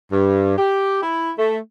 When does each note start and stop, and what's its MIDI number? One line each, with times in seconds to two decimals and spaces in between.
0.11 0.54 43
0.58 1.01 67
1.03 1.33 64
1.39 1.58 57